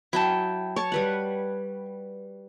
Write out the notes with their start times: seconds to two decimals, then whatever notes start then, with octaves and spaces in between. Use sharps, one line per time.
0.13 F#3 E4 G5 A5
0.76 C#5 A5 C#6
0.92 G3 B4 F#5